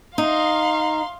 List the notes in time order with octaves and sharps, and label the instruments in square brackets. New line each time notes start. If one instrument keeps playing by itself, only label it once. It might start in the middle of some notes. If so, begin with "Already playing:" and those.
[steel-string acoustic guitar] D#4 [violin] F5 C6